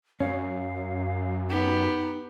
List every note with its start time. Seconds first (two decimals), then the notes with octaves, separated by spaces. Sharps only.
0.20 F#2 C#4 F5
1.50 B3 D#4 G4